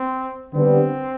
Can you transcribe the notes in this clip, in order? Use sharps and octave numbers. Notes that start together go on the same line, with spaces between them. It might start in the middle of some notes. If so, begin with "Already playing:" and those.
Already playing: C4
D3 G3 B3 C4 D4